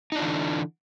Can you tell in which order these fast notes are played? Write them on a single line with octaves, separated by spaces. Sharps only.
D#4 D4 F4 E3 D3